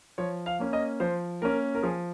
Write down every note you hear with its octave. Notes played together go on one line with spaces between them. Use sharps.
F3 C#5
F5
A#3 C#4
D#5
F3 C5
A#3 C#4 A#4
A#4
F3 G#4